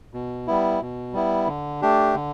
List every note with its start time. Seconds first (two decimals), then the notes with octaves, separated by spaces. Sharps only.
0.13 B2
0.47 G3 B3 E4
0.81 B2
1.13 G3 B3 E4
1.47 D3
1.82 A3 D4 G4
2.15 D3